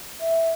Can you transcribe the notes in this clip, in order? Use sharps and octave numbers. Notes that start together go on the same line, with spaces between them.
E5